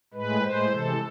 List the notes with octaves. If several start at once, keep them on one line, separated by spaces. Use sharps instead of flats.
A2 G#3 B4
A2 G#3 C5
C3 E3 G#3 A4